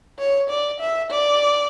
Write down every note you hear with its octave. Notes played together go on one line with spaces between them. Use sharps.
C#5
D5
E5
D5